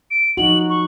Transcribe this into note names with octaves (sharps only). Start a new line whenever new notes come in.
D7
F3 D#4 F#4 F#7
C#6